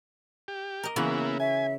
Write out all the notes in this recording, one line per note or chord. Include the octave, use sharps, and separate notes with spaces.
G4
A#4 D#5
C#3 E3 A#3 B3 E4 F#4
E5 G#5